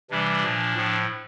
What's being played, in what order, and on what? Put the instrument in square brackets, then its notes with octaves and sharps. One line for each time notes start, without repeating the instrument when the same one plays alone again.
[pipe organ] C3 E3 G3 D4
A#2 F3
A2 F3